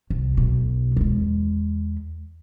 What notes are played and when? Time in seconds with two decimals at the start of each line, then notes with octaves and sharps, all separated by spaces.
0.10 C2
0.37 B1 B2
0.96 E2 G#3